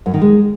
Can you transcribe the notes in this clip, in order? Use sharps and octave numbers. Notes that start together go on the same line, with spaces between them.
F#2
D#3
G#3